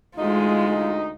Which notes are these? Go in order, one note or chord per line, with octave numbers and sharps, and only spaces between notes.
D2 G#3 D#4 F4